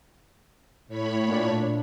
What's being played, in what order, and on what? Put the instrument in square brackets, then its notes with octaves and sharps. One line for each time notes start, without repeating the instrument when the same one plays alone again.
[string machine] A2 C#5 B5
[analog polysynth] A#2 D4